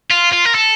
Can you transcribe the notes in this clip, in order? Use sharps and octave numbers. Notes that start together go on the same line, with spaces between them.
F4
F4
A#4
A4